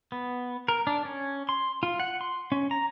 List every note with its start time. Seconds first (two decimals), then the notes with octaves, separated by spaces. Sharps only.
0.12 B3
0.68 A#4
0.87 D4
1.05 C#4
1.49 C6
1.83 F4
2.00 F#5
2.21 C6
2.52 C#4
2.71 A#5